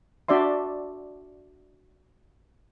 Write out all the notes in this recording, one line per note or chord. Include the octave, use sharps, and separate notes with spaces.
D4 F#4 D5 E5 C6